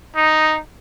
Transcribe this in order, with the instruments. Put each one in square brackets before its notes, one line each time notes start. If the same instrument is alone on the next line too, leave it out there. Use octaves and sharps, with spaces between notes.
[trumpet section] D#4